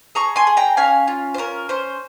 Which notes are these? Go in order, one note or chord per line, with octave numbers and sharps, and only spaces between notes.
G#4 A#5 C#6
G#5 C6
G#4
G5 A#5
C#4 F5 G#5
F4
C5
C#4 A#4
C#4 C5